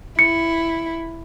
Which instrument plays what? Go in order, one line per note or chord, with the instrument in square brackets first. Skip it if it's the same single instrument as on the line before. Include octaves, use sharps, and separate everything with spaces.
[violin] E4 [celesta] C#7